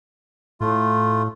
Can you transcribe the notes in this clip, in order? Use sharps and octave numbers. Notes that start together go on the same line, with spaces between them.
A2 A3 F4